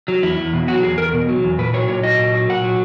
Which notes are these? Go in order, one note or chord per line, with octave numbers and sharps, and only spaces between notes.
F#3
E2 E4
E2
B2
F#3 F#4
E2 G#4
E2 A#4
B2
F#3
E2
A#2 B4
F#3 C#5
A#2 C#5
F#3 D#5
A#2
F#3
A#2 F#5
F#3